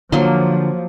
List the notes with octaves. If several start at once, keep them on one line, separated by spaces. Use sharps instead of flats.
D3 F3 F#3 A#3 C6